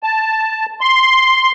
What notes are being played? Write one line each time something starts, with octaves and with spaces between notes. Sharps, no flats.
A5
C6